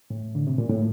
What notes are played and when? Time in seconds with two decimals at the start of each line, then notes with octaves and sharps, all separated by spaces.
0.10 A2
0.35 D3
0.47 C3
0.58 A#2
0.69 A2